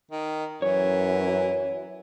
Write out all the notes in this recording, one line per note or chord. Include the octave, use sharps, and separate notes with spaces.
D#3
F#2 E3 C#5